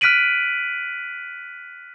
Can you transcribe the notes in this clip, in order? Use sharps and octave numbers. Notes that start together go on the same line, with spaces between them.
F6 F#6 B6 D7 D#7 F#7